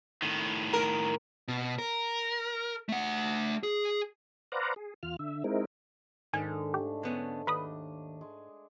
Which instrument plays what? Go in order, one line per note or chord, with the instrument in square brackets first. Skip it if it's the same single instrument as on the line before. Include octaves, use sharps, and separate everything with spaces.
[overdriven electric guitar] A2 D#3
[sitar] A#4
[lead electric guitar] B2
A#4
A3 F#5
G#4
[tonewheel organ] B4 C5 D5 F5 F#5 A#5
G#4
E2 F4 F6
D3 E5
G#3 C4 D#4 E4 A#4
[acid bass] G#2 [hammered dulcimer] D3 [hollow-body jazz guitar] D#3 [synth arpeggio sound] G#5
[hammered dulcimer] A3 D4 [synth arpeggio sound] G4
[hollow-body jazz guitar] D3 B3 C#4
[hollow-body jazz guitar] D#2 [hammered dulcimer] D4 D#5 [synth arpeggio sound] B4 B5 D#6
[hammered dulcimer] G#3